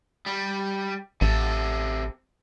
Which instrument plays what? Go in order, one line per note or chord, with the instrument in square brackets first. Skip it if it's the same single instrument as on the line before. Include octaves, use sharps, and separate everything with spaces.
[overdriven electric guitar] G3
[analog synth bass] A1 [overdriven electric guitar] C3 A4